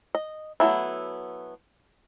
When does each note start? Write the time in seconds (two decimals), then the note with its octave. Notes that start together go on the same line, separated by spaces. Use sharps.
0.15 D#5
0.60 F#3 A3 B3 E4